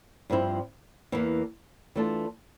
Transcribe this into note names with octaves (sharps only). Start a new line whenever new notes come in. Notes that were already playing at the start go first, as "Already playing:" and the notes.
G2 F3 C4 E4
E2 E3 A#3
E3 A3 D4 F4 A4